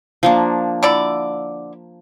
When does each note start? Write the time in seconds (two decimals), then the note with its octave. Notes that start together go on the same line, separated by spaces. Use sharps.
0.23 F3 A#3 D4
0.83 D3 E4 D5